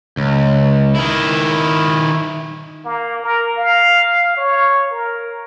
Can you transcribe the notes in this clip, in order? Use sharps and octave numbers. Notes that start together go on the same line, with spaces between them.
C#2
D#3 E4
A#3
A#4
F5
C#5
A#4